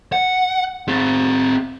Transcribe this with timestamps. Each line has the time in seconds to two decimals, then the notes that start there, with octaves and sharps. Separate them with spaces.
0.12 F#5
0.88 C4 G#4